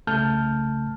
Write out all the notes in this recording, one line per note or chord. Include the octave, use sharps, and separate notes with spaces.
C2 C#3 A3 A5 F6 G6